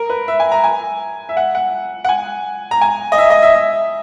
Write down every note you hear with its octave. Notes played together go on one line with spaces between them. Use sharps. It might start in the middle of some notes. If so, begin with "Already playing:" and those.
Already playing: A#4
B4
E5
G#5
A#5
G#5
E5
F#5
F#5
F#5
G#5
A#5
G#5
D#5
E5
D#5
E5
E5